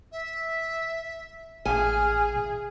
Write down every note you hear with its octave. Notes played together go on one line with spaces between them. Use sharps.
E5
A1 G#4 G#5 F6
B2 E3